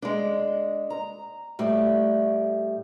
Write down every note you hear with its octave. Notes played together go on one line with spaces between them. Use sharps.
G#3 D4
A#5
A2 G3 A3